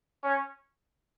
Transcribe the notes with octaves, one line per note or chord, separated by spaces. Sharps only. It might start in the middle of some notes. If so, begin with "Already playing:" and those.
C#4